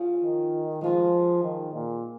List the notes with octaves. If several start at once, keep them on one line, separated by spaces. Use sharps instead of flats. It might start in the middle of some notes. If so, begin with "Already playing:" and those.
Already playing: F3 C#4 F4 G#4
D#3
F3 G#3 F4 G#4
D#3
A#2